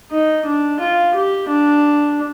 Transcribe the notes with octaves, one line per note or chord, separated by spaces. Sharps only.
D#4
D4
F4
G4
D4